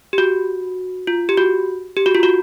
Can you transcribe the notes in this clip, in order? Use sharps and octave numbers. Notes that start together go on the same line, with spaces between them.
G4
F#4
F4
G4
F#4
G4
F#4
F4
F#4